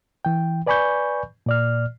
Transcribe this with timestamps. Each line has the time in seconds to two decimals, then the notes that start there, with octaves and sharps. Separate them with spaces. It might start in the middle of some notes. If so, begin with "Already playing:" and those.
0.25 E3 G5
0.67 B4 D5 G#5 B5 C#6 G6
1.46 A#2 D5 F6